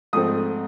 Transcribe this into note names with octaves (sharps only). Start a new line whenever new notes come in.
G#2 F3 A3 C4 D#6